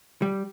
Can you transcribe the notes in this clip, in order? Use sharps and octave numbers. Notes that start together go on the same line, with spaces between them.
G3